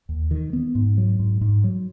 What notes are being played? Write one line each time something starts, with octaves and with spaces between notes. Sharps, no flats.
D#2
D#3
B3
G#2
F#3
G#2
G#2
F#3